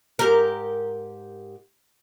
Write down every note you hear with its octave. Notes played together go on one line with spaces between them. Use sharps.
G#2 G4 A#4